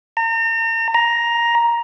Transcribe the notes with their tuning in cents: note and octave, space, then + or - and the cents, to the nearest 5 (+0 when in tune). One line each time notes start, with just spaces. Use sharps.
A#5 -40
A#5 +10